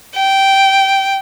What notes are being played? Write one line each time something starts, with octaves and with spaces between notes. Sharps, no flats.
G5